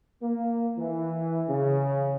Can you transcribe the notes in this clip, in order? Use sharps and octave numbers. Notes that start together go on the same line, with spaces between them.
A#3
E3
C#3